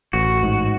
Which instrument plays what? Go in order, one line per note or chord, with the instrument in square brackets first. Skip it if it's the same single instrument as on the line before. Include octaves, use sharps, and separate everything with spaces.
[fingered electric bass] A1 [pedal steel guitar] F#4
[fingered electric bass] G#2